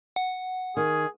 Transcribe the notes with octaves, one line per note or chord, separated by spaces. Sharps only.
F#5
D#3 G#4